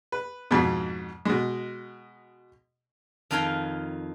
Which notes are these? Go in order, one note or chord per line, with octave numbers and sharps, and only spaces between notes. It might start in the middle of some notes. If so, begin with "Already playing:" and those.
B4
F2 G#2 B2
B2 G#3
F2 D#3 D#4 F5 G5 G#5